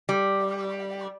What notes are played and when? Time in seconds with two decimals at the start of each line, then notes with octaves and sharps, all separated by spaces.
0.09 G3